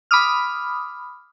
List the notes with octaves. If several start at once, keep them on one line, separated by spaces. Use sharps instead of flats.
B5 D6 D#6 F6